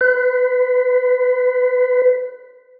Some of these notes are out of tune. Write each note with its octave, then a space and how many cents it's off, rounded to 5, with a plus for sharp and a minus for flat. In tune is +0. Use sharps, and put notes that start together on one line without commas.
B4 +30